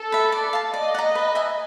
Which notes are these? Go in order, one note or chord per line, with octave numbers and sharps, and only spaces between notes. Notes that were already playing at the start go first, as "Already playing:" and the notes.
Already playing: A4
B4 E5
D5
F5 A5
D5 D#5
F#5 A#5
B4
E5 G#5